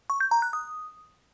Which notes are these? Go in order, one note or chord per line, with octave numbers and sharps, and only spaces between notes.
C#6
G6
A#5
F#6
D#6